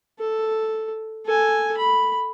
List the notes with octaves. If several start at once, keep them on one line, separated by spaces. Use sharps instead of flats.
A4
A4 G#5
B5